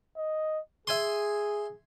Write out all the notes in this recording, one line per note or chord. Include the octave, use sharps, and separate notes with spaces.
D#5
G#4 E5 G#5 C6